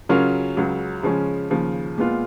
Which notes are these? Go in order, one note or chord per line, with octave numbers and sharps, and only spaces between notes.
C#3 F#3 C#4 F4 A#4
C#2 C#3 F#3
C#3 F3 G#3 C#4
D#2 C#3 F3
A#2 G#3 B3 F4